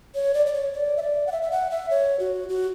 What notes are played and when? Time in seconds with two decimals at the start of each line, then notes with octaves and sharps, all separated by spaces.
0.15 C#5
0.34 D5
0.46 D5
0.54 C#5
0.73 D5
0.97 E5
1.02 D5
1.27 F#5
1.32 E5
1.42 E5
1.52 F#5
1.71 E5
1.90 C#5
2.20 F#4
2.49 F#4